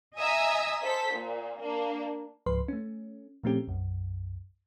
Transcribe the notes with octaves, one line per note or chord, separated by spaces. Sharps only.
D#5 E5 G#5 A#5 D#6 E6
A4 C5 B6
A#2
A#3 D4
C#2 G#2 F3 B4 C6
A3 C#4
A#2 F3 A3 C4 C#4 G4
B1 F#2